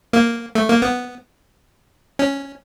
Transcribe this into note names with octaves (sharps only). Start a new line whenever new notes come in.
A#3
A3
A#3
B3
C#4